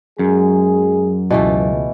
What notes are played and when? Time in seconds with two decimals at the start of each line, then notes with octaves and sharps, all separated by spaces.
0.19 F#2 F#3 G#3 G#4
1.31 C#2 B2 E3 A3